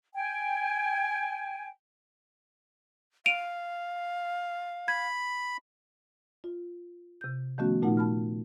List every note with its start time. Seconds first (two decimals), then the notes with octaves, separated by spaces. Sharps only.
0.15 G5 G#5
3.26 F5 D7 D#7 F7
4.88 B5 G#6
6.44 F4
7.21 C3 G6
7.58 D#3 F3 A3 B3 C#4 F#4
7.82 A#2 A3 D#4 F4 F#5
7.97 A5 B5 F6